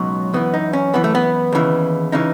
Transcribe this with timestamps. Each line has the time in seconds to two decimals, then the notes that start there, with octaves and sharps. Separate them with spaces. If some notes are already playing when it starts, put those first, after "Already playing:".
Already playing: C#2 B2 F#3 D#4
0.34 F#2 E3 B3
0.54 D#4
0.73 C#4
0.94 F#2 E3 B3
1.04 A3
1.15 B3
1.52 D#2 C#3 E3
2.12 C#3 E3 D#4